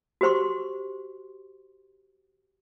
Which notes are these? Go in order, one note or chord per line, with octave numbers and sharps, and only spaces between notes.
F#4 G4 C5 C6 C#6